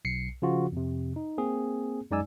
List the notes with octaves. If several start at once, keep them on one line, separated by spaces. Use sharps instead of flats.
B1 C7 C#7
C#3 F3 F4 F#4
F2 C3
D#4
A#3 C4 G#4
F#2 G#3 D#4 D5 G#5 E6